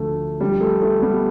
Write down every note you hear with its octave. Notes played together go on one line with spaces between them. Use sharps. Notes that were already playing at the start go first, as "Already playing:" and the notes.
Already playing: D2 D3 F3 A3
D2 D3 F3 G3
A3
A3
G3 B3